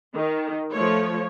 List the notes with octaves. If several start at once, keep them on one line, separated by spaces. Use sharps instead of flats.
D#3
F3 A3 C#5